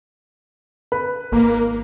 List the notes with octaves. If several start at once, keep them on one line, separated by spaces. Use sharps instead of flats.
B4
G#1 A#3